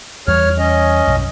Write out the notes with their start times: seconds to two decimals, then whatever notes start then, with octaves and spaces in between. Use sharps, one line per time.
0.28 E2 G3 C#5 F6
0.58 C#4 D#5
1.07 B1 F#2